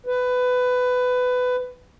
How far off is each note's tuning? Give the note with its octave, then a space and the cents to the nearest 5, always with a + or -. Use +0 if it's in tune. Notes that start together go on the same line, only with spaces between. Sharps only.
B4 +20